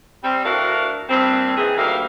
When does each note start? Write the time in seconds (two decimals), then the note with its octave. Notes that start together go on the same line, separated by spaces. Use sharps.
0.24 G3 C4
0.45 D2 D4 E4 F#4 A#4 F5
1.10 G2 A#2 C4
1.57 D#3 E3 G#4
1.77 D2 D#3 G3 A#3 E5 F5